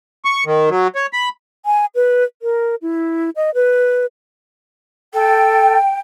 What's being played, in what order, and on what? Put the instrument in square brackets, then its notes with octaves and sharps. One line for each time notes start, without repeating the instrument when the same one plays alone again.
[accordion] C#6
D#3
F#3
C#5
B5
[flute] G#5
B4
A#4
E4
D#5
B4
[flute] A4 [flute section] G5